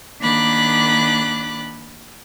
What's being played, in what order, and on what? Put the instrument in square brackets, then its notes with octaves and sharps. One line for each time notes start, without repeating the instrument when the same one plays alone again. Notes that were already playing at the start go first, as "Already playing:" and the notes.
[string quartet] D#3 A#3 D4 B5 D6 F#6